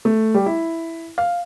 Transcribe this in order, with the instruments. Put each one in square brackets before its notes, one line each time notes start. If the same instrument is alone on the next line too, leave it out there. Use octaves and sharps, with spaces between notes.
[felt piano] A3
G3
E4
F5